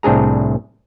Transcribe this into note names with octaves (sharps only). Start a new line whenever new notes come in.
C2 A2 C4 D4 G#4 A#5